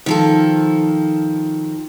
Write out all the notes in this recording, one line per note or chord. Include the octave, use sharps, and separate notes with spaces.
D#3 F3 A4